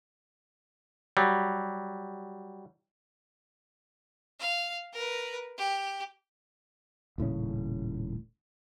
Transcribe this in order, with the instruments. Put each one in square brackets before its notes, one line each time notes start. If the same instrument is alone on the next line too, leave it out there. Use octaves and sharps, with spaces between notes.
[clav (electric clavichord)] F#3 G3
[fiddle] F5
A#4 B4
G4
[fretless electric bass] D#1 A2 C#3 C#4